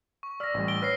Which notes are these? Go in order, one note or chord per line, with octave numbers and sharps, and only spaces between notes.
C#6
D5 E6 F6 A#6 B6
A1 G3
D7 G7
B4 C#5 F6 A#6 C7